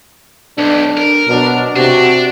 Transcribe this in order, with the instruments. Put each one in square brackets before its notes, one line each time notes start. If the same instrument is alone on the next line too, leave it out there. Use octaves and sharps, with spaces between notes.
[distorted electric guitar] B1 [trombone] D4
[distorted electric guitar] A#4
[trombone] B2 [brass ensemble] F#3 D4
[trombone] C3 [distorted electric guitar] D4 [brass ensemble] F#4